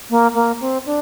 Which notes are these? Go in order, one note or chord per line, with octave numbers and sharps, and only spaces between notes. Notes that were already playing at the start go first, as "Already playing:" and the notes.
A#3
A#3
C4
D4